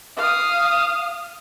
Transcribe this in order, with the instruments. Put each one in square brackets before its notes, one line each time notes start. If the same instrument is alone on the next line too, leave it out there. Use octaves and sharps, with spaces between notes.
[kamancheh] F5 D#6